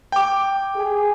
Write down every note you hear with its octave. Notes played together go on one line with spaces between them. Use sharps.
G5 D6
G#4